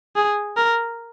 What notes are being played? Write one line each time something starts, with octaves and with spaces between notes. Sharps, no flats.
G#4
A#4